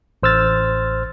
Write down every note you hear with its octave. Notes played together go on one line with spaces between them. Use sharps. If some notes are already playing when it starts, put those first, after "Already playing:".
A1 C5 E6 F6 A6